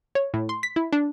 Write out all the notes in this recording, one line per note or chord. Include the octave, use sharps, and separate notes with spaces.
C#5
A2
C6
B6
E4
D4